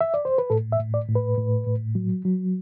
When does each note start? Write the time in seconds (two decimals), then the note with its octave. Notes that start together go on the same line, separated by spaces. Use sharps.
0.01 E5
0.14 D5
0.25 C5
0.38 B4
0.50 A2 A4
0.72 E5
0.79 A2
0.94 D5
1.08 A2
1.15 B4
1.37 A2
1.67 A2
1.95 F#3
2.25 F#3